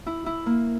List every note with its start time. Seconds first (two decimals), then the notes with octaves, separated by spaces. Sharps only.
0.06 E4
0.26 E4
0.46 A#3